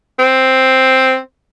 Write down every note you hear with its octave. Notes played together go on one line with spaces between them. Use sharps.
C4